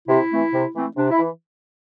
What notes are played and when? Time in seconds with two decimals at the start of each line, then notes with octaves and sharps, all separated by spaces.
0.08 C3 E4
0.31 E3 A3 C4
0.53 C3
0.75 E3 A3 C4
0.96 C3 D4
1.11 E4
1.19 E3